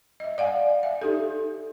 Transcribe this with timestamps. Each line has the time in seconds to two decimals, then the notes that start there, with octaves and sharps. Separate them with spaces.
0.20 D#5 E5
0.38 D5 F5 F#5 G#5
0.83 E5
1.02 D#4 G4 A4